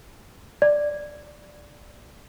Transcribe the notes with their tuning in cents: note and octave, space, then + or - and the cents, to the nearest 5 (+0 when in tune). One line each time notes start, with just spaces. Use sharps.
D5 +5